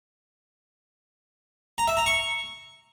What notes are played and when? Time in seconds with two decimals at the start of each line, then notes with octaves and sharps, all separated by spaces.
1.78 A#5
1.88 E5
1.97 A#5
2.06 C#6